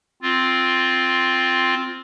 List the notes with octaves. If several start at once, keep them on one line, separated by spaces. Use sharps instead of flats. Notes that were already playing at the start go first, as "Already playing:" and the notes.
C4 F4